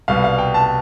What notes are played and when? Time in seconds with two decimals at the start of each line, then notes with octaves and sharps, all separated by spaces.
0.08 C2 B2 G3 F5
0.24 F5
0.38 G5
0.54 A5